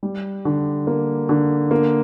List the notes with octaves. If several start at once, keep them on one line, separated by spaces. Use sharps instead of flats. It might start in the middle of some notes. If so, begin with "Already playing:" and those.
G3
D3
A#3
D3
A#3